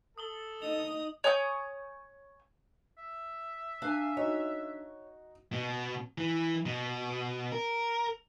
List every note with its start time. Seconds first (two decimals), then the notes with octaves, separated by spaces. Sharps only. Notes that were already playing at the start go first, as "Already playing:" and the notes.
0.18 A4 D#6 F#7 G7
0.62 D#4 D#5 D#6 F7
1.24 C#5 G#5 D#6 G6
2.98 E5
3.82 D4 F5 G#5
4.17 D#4 F#4 C#5
5.53 B2
6.18 E3
6.66 B2
7.52 A#4